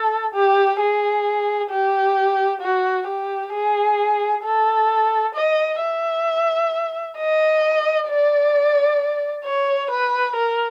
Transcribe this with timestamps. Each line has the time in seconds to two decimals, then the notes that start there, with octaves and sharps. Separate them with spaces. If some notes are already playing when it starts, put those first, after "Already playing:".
Already playing: A4
0.34 G4
0.79 G#4
1.71 G4
2.61 F#4
3.07 G4
3.53 G#4
4.44 A4
5.35 D#5
5.81 E5
7.18 D#5
8.08 D5
9.45 C#5
9.91 B4
10.36 A#4